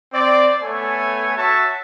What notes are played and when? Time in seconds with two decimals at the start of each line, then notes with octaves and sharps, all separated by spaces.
0.13 C4 D5
0.61 A3 B3 A4 C#5 G#5
1.37 F#4 C#5 E5 A5 C#6